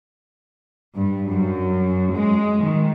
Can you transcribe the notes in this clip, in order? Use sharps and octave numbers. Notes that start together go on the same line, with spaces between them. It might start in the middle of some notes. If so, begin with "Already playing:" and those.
G2
F#2
G#3
D#3